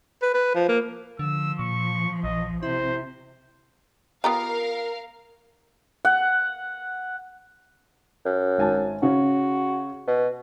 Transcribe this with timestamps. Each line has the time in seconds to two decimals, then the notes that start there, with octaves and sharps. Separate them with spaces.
0.22 B4
0.34 B4
0.55 F3
0.69 A#3
1.19 D3 F3 E6
1.59 A#2 C#6
2.24 A#1 D#5
2.63 C3 E4 C5
4.24 B3 F4 G4 A#4 F5 A#5
6.05 F#5
8.26 F#2
8.58 G#1 G#5 A5
9.03 C#3 C#4 F#4
10.08 B2